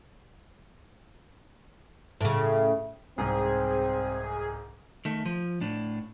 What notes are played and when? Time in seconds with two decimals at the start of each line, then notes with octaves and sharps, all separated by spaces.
2.21 A2 C#3
3.18 C2 G#2 C4 G#4
5.05 D#3 A3
5.26 F3
5.61 A2 D4